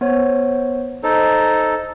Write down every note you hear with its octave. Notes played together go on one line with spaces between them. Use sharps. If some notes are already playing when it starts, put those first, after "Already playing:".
B3 C5 C#5
D#4 A4 C5